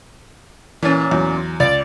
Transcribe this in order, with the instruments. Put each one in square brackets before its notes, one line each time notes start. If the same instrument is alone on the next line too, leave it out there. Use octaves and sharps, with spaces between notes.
[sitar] A#2 C#4 [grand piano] E3
[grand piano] E2 F#3
[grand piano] C#2 [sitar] D5